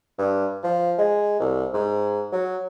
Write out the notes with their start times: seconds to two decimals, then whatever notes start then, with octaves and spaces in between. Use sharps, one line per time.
0.18 G2
0.64 F3
0.99 G#3
1.40 C2
1.74 G#2
2.32 F#3